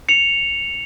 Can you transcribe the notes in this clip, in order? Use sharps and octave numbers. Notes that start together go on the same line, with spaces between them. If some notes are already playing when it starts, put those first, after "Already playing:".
C#7 F7